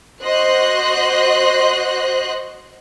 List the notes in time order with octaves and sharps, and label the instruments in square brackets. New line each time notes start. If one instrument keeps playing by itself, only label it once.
[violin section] F#4 C5 D#5 C6 F#6